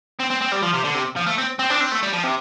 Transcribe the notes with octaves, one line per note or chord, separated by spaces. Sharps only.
C4
C4
C4
G3
F3
C3
D3
C3
F3
A3
C4
C4
D4
C4
A3
G3
F3
C3